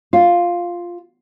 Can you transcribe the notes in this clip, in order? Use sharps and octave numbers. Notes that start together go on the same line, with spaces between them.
F4